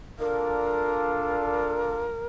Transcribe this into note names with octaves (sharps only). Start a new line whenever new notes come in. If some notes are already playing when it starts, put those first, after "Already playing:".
D4 F4 A4 A#4 D5 F5